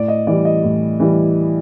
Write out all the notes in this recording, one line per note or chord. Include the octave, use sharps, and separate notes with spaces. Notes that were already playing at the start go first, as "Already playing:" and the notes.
Already playing: A2 D5
D#5
E3 G3 D5
D#5
A2
E3 G3